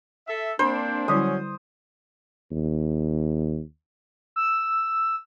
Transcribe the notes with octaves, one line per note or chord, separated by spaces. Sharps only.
A4 E5
A#3 C4 D4 C5 B5
D3 F#3 G3 C#4 E4 D#6
D#2
E6